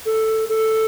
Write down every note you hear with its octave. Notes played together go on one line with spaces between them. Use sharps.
A4
A4